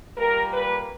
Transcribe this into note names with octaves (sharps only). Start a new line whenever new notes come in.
A#2 G3 A#3 A#4
B4